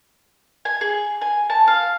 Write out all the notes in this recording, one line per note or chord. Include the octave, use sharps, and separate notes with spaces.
G#5
G#4
G#5
A5
F5